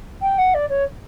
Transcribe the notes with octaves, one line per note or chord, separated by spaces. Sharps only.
G5
F#5
D5
C#5